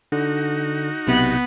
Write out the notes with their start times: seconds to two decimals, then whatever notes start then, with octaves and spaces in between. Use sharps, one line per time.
0.12 D3 D#4 F#4
1.07 B1 C3 B3